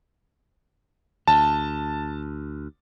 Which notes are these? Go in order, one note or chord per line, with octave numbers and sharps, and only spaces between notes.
D2 A5